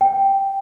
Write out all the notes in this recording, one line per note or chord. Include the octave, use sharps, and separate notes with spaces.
G5